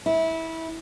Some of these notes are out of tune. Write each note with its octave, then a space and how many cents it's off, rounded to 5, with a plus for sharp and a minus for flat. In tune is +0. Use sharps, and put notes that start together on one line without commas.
E4 -20